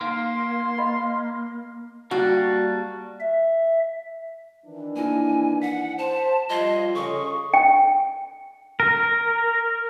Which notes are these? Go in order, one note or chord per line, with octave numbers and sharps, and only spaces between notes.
A#3 D#4 F5 C6
D#5 F5 B5
G3 A#3 F#4 A5
E5
D#3 E3 D4
A#3 E4 G#5
F#5 B6
C5 A5
F3 G3 F4 D#5 C6 G#6 C7
C#3 A4 G#5 C#6 D#6
G5
A#4